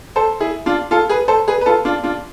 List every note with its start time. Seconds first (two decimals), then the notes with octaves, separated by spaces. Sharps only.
0.16 A4 C5
0.40 E4 G#4
0.66 D4 F4
0.91 F4 A4
1.09 G#4 B4
1.28 A4 C5
1.48 G#4 B4
1.61 B4
1.66 F4 A4
1.85 D4 F4
2.03 D4 F4